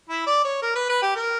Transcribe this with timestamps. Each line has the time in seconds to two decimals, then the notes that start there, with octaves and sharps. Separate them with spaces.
0.09 E4
0.27 D5
0.45 C#5
0.62 A#4
0.76 B4
0.89 B4
1.02 G4
1.16 A#4